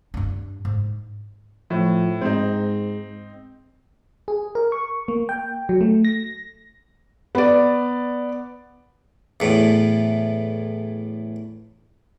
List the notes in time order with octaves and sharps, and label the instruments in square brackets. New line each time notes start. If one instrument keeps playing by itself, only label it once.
[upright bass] G2 D4
G#2
[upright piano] A2 [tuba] F3
[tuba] G#2 [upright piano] C4 D#4
[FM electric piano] G#4
A#4
C#6
A#3
G5
F#3
A3
A#6
[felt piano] B3 D5
[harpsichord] E2 A2